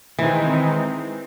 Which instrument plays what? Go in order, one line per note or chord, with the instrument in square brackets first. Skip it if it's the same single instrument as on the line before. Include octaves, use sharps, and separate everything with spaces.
[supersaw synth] D#3 G#3 C4 D#4 [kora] E3